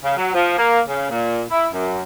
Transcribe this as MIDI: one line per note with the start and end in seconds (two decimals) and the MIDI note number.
0.04 0.16 49
0.17 0.32 54
0.34 0.55 53
0.57 0.81 58
0.86 1.08 49
1.10 1.42 46
1.50 1.67 64
1.72 2.03 42